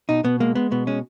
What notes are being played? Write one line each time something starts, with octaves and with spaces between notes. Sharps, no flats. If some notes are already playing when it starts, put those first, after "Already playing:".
B2 D#4
B2 B3
G#3 A#3
G#3 B3
B2 B3
G#3 C#4